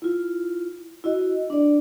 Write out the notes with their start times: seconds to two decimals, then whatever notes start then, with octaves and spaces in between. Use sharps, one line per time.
0.02 E4 F4
1.04 E4 F#4 D#5
1.50 D4 D5